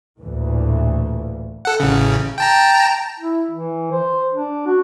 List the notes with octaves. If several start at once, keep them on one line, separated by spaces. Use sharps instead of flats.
A1 D2 A#2 E3
A4 F#5
A1 C#3
G5 A5 A#5
E4
E3
C5
D4
F#4